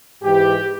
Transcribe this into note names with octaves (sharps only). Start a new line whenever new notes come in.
G#2 E3 G4